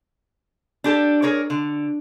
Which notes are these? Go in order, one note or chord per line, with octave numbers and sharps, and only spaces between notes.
D4 G4 A4
G#4 A#4 C#5 D5
D3